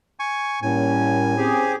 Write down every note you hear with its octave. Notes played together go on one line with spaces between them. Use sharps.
G#5 C#6
A2 G3 A#3 C#4 G#5
C4 C#4 G4 G#4